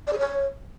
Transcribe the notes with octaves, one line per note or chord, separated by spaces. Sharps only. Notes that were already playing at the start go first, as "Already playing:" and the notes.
D5
G#4
C#5